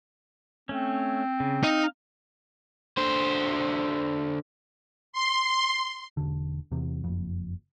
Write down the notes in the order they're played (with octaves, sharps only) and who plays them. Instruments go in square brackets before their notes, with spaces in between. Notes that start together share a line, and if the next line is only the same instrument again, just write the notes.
[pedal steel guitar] A3 C#4 [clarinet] C4
[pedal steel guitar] C#3
[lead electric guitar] D#4 [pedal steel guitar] F5
[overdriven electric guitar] D3 C5
[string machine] C6
[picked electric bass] E1 D3
E2 C3
F#1 F2